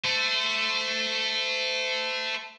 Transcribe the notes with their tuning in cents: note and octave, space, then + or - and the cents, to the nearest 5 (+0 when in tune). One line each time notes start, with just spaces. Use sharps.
A3 +0 C5 -30